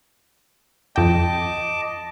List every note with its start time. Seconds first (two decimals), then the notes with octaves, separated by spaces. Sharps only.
0.96 F2 D#5 G5 A5 D6